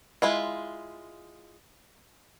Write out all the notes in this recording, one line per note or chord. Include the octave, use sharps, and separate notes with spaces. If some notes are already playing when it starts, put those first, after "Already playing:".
G#3 E4 F4